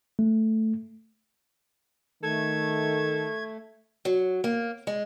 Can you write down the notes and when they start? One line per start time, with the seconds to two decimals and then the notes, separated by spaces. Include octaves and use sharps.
0.19 A3
2.23 D#3 A3 A4 G#6
4.05 F#3
4.44 A#3
4.87 G#3